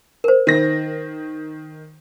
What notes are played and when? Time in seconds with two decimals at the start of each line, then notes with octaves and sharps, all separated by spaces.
0.24 A#4 C5
0.47 D#3 A#6